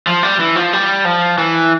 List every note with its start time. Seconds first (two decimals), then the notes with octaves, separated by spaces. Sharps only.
0.07 F3
0.23 G3
0.39 E3
0.56 F3
0.73 G3
1.05 F3
1.38 E3